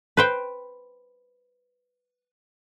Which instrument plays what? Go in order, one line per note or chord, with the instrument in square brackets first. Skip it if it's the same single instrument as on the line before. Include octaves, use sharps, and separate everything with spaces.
[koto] B4 C5 G5